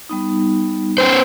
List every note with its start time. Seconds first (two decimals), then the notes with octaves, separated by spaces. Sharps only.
0.09 G3 B3 D#4
0.98 B3 C#4 C5